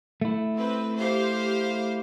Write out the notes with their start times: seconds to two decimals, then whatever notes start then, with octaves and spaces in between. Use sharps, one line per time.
0.22 A3 E4
0.57 C4 B4
0.99 G4 C5 F5